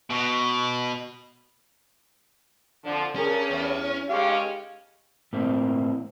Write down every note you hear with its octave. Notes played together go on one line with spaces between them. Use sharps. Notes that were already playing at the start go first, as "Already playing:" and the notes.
B2
F2 D3 F3
G2 C#4 G#4 A#4
E2
G2 C#3 G#3 C#4 G4 F5
A2 A#3 C4